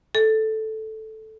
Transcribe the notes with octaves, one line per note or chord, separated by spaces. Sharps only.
A4